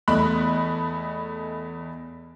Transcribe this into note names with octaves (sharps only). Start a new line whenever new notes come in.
E2 A3 D#5 B5 F#6